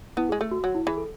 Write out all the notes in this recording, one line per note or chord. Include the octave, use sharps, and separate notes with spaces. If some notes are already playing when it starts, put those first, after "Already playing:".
B3 E4
G#3 G#4
A3 A4
F#4
F#3 F#4
E4
E3 G#4
A4